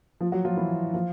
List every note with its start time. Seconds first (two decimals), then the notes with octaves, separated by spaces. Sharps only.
0.21 F3 F4
0.32 F#3 F#4
0.45 F3 F4
0.57 E3 E4
0.94 F3 F4